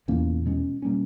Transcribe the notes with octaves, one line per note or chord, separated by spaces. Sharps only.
E2 A#2 A#3 C#4
B2 G#3 C#4
B2 G3 A#3 C#4